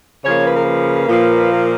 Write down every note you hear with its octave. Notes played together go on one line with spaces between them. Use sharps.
C#3 F3 A#3 C#5
B4
A#4
B4
A#2 F3 A#3
A#4